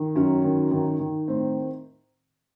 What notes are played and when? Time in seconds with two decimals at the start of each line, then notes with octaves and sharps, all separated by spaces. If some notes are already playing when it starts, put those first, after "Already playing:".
Already playing: D#3
0.15 F#2 C#4
0.44 D#3
0.71 D#3
0.99 D#3
1.28 A2 C4